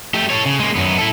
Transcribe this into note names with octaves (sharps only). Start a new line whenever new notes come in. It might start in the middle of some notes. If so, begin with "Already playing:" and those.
A3 G4
A4 C#5
C#3
G#3 A#3
F#2 B3
E4 A4